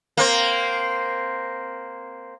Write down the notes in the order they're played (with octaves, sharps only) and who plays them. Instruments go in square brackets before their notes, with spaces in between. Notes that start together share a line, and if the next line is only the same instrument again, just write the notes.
[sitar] A#3 C4